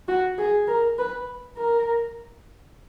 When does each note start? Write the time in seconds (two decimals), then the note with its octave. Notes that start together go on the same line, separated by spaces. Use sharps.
0.08 F#4
0.38 G#4
0.67 A#4
0.98 B4
1.57 A#4